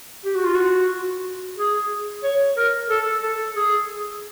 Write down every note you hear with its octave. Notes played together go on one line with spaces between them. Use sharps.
G4
F#4
F4
F#4
G#4
C#5
A#4
A4
A4
G#4